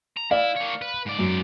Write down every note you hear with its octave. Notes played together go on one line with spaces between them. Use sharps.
A#5
E4 D5 F5
A#3 C#5
B4
G#2 D5
F#2